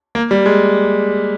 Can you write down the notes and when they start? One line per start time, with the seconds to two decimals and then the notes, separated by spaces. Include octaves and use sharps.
0.15 A#3
0.31 G3
0.46 G#3